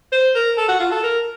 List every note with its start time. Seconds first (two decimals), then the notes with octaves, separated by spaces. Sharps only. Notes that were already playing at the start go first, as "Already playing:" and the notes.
0.12 C5
0.35 A#4
0.58 A4
0.68 F#4
0.80 F4
0.92 A4
1.03 A#4